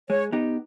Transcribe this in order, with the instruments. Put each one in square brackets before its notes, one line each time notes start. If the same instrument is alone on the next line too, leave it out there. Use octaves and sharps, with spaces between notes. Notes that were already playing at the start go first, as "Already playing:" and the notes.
[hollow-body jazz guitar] G#3 [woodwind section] C#5
[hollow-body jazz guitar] B3 D#4 G4